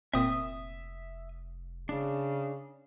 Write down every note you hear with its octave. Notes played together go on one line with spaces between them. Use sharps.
F1 A#2 C4 E5 D#6
C#3 D4